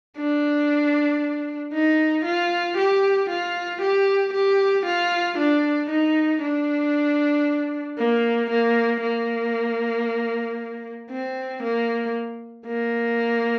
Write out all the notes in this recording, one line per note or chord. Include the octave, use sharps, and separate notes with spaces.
D4
D#4
F4
G4
F4
G4
G4
F4
D4
D#4
D4
A#3
A#3
A#3
C4
A#3
A#3